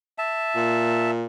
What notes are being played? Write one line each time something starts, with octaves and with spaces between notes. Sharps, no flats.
E5 A5
A#2